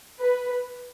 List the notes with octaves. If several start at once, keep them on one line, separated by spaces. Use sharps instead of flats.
B4